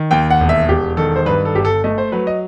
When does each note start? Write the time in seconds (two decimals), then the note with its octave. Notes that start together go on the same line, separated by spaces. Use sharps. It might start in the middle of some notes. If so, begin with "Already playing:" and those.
Already playing: D#3
0.11 D#2 G5
0.30 F#5
0.40 E1
0.49 E5
0.68 E1 G4
0.97 D#3 A4
1.16 C5
1.26 G2 B4
1.45 A4
1.55 G1 G4
1.65 A4
1.84 A3 D#5
1.98 C5
2.12 F#3 B4
2.27 D#5